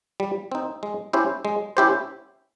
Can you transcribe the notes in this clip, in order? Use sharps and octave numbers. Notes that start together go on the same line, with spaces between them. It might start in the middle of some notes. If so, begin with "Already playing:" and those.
G3
C4 D#4
G#3
C#4 E4 G4 C5
G#3
C#4 E4 G4 C5